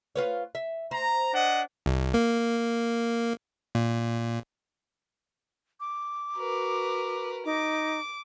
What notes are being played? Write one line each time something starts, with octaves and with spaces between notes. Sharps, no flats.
F4 B4 C#5
E5
C5 A#5
D4 D#5 F#5
C2
A#3
A#2
D6
F#4 A#4 B4
D#4 D6